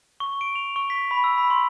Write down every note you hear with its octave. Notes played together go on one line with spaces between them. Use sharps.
C#6
D7
F7
C#6
B6
B5
E6
B5
C6